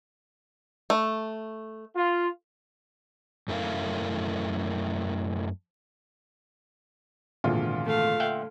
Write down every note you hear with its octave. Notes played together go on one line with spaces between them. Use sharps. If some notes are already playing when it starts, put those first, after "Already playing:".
A3
F4
F#2 A3 E4 A#4 F5
G#1 E2 A#2 D3 F4
A3 F5
E5 F#5 G5